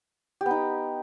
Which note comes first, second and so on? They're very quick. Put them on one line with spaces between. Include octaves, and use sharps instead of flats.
G4 B3 D#4